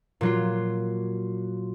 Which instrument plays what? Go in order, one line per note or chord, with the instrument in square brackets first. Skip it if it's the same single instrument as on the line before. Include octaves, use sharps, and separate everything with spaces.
[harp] A#2 F#3 F4